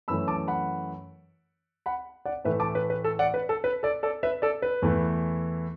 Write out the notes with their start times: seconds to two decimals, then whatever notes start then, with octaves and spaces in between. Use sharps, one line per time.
0.08 F#2 E3 A3 B5 E6
0.28 A5 D6
0.48 F#5 B5
1.86 F#5 B5
2.25 D5 F#5
2.44 A2 E3 A3 B4 E5
2.60 A5 D6
2.75 B4
2.90 B4
3.04 A4
3.19 D5 F#5
3.34 B4
3.49 A4
3.64 B4
3.83 A4 D5
4.03 A4 D5
4.23 B4 E5
4.42 A4 D5
4.62 B4
4.82 E2 E3 A3